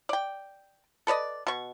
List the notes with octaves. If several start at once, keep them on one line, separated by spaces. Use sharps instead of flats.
D5 G5
A4 B4 D5 D#5
B2 C#6